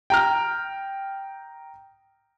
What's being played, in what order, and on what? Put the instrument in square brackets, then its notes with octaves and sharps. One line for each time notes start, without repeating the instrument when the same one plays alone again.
[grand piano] G5 A#5 F6